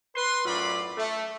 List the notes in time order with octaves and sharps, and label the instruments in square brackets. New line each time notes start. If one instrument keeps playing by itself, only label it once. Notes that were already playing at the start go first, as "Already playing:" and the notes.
[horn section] B4 C6
F#2 A2 F#3 F4 D5 B5
A3